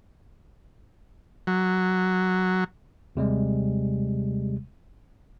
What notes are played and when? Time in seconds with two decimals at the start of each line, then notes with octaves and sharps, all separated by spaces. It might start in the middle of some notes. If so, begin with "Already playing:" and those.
1.47 F#3
3.15 D#2 C3 G3 G#3